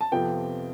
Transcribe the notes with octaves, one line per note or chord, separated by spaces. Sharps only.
A5
F2 C3 F3 B3 G5